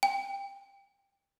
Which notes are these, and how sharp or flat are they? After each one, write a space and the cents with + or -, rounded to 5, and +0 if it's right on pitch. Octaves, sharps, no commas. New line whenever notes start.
G5 +20